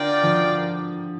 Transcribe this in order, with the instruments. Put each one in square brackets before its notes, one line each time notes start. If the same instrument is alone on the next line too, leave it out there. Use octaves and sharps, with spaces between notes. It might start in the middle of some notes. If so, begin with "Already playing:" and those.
Already playing: [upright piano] D3 [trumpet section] F4 A#4 D5 G5
[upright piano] F3